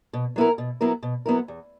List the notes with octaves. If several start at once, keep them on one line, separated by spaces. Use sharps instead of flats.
B2
F#3 B3 E4 A#4
B2
F#3 B3 E4 A#4
B2
F#3 B3 E4 A#4
E2